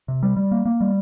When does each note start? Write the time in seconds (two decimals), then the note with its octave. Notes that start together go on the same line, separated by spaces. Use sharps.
0.08 C3
0.23 G3
0.36 G3
0.51 A#3
0.66 A#3
0.81 G3